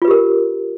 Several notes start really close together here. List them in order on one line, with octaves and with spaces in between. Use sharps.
F4 B4 G4 A#4